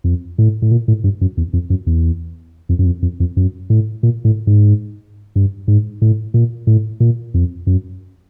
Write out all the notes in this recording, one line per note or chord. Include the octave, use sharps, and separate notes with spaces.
F2
A2
A2
A#2
A2
G2
F#2
E2
F2
F#2
E2
F2
F#2
F2
F2
F2
F#2
A2
A#2
A2
G#2
G2
G#2
A2
A#2
A2
A#2
F2
F#2